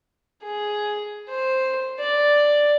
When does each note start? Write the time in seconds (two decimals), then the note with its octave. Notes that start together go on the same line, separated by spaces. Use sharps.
0.43 G#4
1.29 C5
2.00 D5